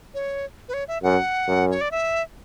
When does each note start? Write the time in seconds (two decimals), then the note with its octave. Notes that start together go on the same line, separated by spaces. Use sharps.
0.14 C#5
0.69 B4
0.74 C#5
0.88 E5
1.03 F#2 F#5
1.48 F#2
1.71 C#5
1.81 D5
1.91 E5